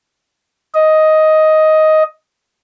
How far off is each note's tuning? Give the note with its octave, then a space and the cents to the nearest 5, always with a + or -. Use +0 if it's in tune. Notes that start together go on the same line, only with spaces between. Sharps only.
D#5 +10